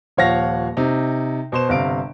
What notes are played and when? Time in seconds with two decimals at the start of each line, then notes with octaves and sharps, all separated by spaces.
0.17 D#1 F3 C#5 F5 F#5 A#6
0.77 C3 D#4
1.52 B2 C5 E7
1.69 G1 C3 F5 D7